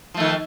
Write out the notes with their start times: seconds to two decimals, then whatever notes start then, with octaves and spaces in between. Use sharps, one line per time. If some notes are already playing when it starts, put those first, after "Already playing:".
0.14 F3
0.17 A3
0.20 D#3